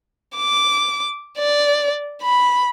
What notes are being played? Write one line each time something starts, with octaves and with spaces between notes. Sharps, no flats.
D6
D5
B5